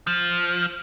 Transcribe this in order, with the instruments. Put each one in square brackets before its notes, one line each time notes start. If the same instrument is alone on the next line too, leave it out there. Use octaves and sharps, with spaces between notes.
[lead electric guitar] F3